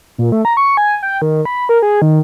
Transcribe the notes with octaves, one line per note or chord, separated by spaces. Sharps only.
A#2
A3
A#5
C#6
G#5
G5
D#3
B5
A#4
G#4
D#3